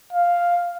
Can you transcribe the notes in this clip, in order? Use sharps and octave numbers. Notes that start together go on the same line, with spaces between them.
F5